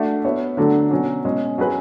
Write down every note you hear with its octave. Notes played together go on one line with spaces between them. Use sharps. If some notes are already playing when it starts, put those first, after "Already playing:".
Already playing: A3 D4 F#4 A4 E5
B3 F#4 C#5 E5
D3 F#3 A3 D4 A4
B2 F#3 C#4
B2 G#3 C#4
F#3 C#4 G#4 B4